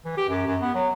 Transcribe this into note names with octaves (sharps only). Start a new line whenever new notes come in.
E3
G4
F#2
F#2
B3
F#3